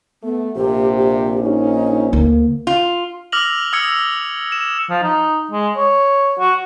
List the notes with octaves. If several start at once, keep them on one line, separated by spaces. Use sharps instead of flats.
A3 B3
A#1 C3 G4
G4
C#4 D#4
D2 A#3
F4
D6 E6 F6 A#6 F7 F#7
D#6 E6 G#6 C#7 F#7
E7
F3
D#4
G#3
C#5
F#4